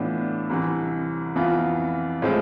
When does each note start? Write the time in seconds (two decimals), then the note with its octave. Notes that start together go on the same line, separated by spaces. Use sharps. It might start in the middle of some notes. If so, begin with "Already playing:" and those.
Already playing: A2 E3 B3 D4 F4
0.50 C2 C3 E3
1.35 F2 E3 B3 F4
2.22 A2 F3 G#3 C4 F4